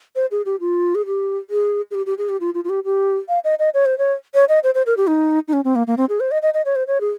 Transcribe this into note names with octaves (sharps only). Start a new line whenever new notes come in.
C5
G#4
G4
F4
G#4
G4
G#4
G#4
G4
G4
G#4
G4
F4
F4
F4
G4
G4
F5
D#5
D#5
C#5
C5
C#5
C#5
D#5
C5
C5
A#4
G4
D#4
D#4
C#4
C4
A#3
A#3
C4
G#4
C5
D#5
D#5
D#5
C#5
C5
C#5
G#4